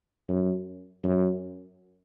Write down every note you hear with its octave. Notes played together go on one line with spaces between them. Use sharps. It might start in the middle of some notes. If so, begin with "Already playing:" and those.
F#2
F#2